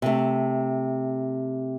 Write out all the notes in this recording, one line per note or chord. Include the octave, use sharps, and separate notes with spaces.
C3 A3